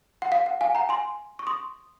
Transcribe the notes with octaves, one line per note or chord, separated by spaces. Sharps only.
F#5
F5
F#5
F5 G#5
F#5 A#5
G#5 C6
C#6
C6 D#6